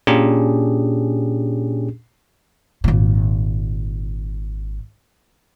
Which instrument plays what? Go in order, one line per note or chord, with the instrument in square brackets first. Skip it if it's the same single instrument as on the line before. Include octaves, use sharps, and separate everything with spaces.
[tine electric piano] A#2 C#4 D4 G4 G#4
[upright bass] G#1 A#2